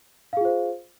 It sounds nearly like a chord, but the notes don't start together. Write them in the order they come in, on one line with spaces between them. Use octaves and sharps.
F5 G#4 F4 C5